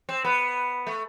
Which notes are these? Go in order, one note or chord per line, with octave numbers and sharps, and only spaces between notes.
C4
B3
A3